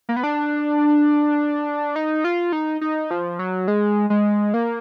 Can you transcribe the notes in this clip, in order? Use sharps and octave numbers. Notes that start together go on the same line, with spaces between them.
A#3
B3
D4
D#4
F4
D#4
D#4
F3
F#3
G#3
G#3
A#3